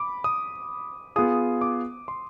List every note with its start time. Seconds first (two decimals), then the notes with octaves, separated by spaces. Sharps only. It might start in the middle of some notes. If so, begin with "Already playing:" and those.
Already playing: B5 D6
0.24 D#6
1.16 B3 F4 G#4 D#6
1.61 D6
2.08 C6